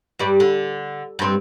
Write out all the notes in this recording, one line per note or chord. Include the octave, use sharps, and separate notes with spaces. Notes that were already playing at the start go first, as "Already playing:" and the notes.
G2 G3 D5
D3
G2 C4